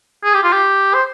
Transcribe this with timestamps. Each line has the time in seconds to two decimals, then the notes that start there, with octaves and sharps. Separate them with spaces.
0.24 G#4
0.34 G4
0.43 F4
0.53 G4
0.94 C5